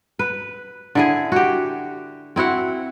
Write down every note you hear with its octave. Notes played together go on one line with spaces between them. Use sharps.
B4
D3 E4 G#4
F#4 G4
C4 E4 F#4 F#5